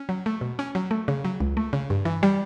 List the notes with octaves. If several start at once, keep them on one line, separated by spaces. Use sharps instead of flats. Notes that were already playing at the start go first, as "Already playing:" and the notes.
Already playing: C#4
F#3
A3
B2
C#4
F#3
A3
C#3
F#3
C#2
A3
C#3
G2
E3
G3